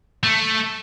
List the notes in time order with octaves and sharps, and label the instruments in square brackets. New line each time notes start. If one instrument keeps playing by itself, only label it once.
[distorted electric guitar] A3